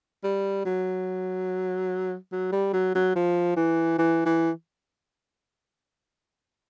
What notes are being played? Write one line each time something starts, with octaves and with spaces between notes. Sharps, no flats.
G3
F#3
F#3
G3
F#3
F#3
F3
E3
E3
E3